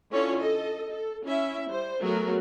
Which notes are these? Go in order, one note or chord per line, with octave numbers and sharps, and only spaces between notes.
D3 C#4 E4 F4 A4 C#5
A4 D#5
A4
C#4 E4 E5
G3 C5
F#3 A3 B3 F#4 G#4 A#4